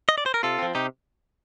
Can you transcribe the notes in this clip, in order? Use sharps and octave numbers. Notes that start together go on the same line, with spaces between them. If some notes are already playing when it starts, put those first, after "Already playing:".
D#5
D5
C5
A#4
C3 F4 A4
F3 C4
C3 D#4 G4